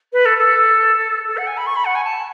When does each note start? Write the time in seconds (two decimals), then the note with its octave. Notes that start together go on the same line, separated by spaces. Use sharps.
0.12 B4
0.25 A4
0.38 A4
1.27 A4
1.37 F#5
1.46 G#5
1.56 B5
1.66 C#6
1.75 B5
1.85 F#5
1.94 G#5
2.04 A5